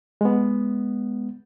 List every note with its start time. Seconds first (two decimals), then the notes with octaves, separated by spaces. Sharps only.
0.21 G#3 B3